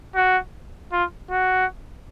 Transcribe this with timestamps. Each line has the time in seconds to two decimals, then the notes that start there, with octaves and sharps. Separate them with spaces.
0.15 F#4
0.93 F4
1.31 F#4